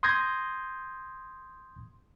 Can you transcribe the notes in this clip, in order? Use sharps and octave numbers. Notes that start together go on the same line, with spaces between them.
C6 D#6 G6 G#6 A#6